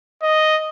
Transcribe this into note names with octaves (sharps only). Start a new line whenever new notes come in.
D#5